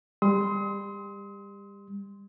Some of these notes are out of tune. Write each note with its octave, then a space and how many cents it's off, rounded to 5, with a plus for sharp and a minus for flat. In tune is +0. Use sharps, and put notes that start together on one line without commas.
G3 +30 C6 -5 D#6 +40